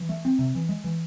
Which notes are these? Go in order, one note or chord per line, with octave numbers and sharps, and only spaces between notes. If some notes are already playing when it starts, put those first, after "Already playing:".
Already playing: E3
A3
C4
C3
E3
G#3
E3